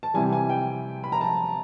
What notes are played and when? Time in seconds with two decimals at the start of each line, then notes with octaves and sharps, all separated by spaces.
0.03 A5
0.14 C3 E3 G3 G#5
0.33 G#5
0.49 G5
1.04 B5
1.12 A#5
1.21 A5